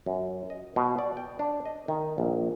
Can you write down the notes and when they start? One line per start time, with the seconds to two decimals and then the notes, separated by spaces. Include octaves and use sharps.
0.06 F#2
0.50 D#5
0.76 B2
0.98 D5
1.17 G5
1.39 D4
1.65 D#5
1.88 D#3
2.18 A#1